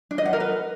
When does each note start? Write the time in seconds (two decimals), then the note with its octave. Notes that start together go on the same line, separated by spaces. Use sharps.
0.11 D4
0.18 D#5
0.25 F#5
0.33 A#4
0.40 B4